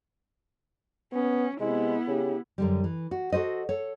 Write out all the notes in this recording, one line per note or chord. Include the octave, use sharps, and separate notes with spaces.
B3 C#4
C3 G#3 B3 E4
C#3 G4
F#2 D3 G3
E3
F#4
F#4 A4 C5 D#5
A4 C#5